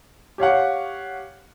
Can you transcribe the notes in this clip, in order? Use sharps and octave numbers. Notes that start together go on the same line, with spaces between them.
G4 C#5 F5 F#5